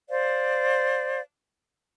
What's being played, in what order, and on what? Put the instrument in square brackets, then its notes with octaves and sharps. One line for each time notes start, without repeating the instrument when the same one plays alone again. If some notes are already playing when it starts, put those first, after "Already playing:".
[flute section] C5 D5 F5